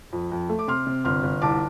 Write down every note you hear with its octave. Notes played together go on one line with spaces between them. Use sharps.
F2
F2
A3
D6
C3 C6 F6
C3
G1 C6 F6
G1
C2 A5 D6